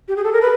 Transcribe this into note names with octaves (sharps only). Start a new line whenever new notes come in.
G4
G#4
A4
A#4
B4